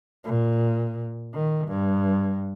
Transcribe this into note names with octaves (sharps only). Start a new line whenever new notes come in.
A#2
D#3
G2